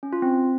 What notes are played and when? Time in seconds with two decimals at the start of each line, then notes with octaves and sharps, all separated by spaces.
0.03 C#4
0.13 F4
0.22 C4